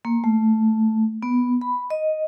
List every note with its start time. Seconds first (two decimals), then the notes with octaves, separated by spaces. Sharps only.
0.05 A#3
0.24 A3
1.23 B3
1.61 B5
1.90 D#5